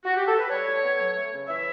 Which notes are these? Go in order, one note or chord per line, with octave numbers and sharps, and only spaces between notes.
F#4
G4
A4
B4
G3 A4 C#5
A2
B3
F#3
A3
C#3
E3 C#5 E5